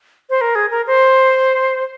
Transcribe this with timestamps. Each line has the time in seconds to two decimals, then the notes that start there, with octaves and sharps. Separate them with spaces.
0.30 C5
0.41 A#4
0.55 G#4
0.71 A#4
0.87 C5